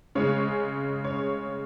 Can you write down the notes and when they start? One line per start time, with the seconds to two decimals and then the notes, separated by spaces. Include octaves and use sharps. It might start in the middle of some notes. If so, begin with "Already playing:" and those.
0.15 C#3 G#3 C#4 C#5
1.04 C#5